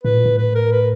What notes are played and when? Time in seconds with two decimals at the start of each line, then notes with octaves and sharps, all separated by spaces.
0.04 A2 B4
0.14 A#2
0.26 A2
0.38 B4
0.55 A#4
0.72 B4